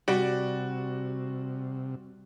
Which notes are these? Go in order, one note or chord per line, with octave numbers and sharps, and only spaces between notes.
C3 G3 F#4 D5